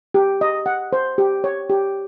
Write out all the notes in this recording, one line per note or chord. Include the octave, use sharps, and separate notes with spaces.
G4
D#5
F#5
C5
G4
C#5
G4